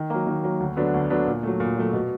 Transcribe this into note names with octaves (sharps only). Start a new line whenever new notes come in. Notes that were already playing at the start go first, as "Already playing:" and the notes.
Already playing: D#3
F#3 A#3
D#3
F#3 A#3
D2
D3 F#3 B3 D4
D2
D3 F#3 B3 D4
A#2
F#3 A3
A#2
F#3 A3
B2